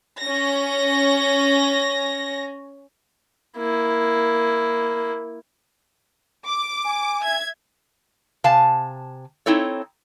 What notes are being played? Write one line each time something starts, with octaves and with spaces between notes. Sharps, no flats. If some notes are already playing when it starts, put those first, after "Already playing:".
C#4 A#6
A#3 E4
D6
G#5
E5 G#6
C3 F5 G#5 A5
C4 D#4 E4 A4 C#5